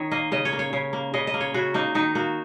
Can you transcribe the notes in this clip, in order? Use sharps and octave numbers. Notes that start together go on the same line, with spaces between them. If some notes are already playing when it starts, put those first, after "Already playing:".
Already playing: D#3 C#5
A#3 D#5
C#3 D#5
C#5
A#3
C#5
C#3
A#3
C#3 D#5
D#5
A#3
C#5
C#3 F#4
A#3 D#4
D#3 D#4
A#3 F#4